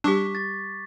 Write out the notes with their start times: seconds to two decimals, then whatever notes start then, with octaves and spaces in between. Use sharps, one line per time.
0.04 G3 D4 G4 C#6 D6 B6
0.35 A6